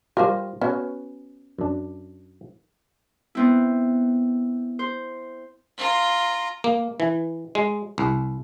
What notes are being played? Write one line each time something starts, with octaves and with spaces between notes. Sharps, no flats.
G3 F4 G4 A#4 C5
B3 C#4 F#4 C#5
F#2 D4
B3 C4 E4
C5
F4 A#5
A#3
E3
G#3
C2